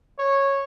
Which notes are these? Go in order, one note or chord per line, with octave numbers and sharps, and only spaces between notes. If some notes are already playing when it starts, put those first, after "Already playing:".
C#5